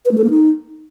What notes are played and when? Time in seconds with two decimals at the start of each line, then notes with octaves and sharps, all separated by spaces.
0.05 B4
0.12 A3
0.18 A4
0.24 A#3
0.30 D#4